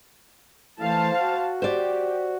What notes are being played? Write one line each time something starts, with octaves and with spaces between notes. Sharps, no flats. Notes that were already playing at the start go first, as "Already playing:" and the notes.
E3 A3 C5 F5 A5
F#4
G4 C5 D5